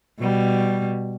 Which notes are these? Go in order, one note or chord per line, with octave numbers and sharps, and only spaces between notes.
B2 G3